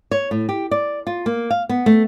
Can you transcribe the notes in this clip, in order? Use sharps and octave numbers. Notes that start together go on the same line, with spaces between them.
C#5
A2
G4
D5
F4
A#3
F5
B3
A3